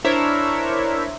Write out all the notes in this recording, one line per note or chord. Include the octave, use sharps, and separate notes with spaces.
D4 E4 A#4 C5 C#5 E5